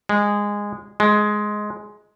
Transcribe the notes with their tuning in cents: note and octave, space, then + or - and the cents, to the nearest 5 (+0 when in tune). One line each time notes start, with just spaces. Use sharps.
G#3 -15
G#3 +10